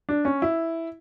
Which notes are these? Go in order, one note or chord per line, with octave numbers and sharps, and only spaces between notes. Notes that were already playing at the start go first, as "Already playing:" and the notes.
D4
C#4
E4